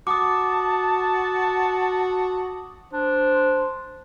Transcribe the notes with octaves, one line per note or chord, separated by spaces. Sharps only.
F#4 A5 D6 D#6
D4 C5